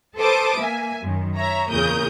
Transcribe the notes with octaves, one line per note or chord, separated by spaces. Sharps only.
A4 B4 C5 A5 D6 D#6
A#3 E5 G#5
F#2 D#3
C#5 E5 A#5
E2 A#2 C#3 A#4 D#6 G6